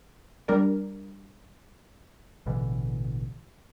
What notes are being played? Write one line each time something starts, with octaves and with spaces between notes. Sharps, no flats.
G3 D4 A#4 D5
A1 B2 D3 E3